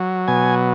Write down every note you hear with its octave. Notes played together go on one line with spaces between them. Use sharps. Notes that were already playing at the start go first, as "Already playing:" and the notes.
Already playing: F#3
B2 G#5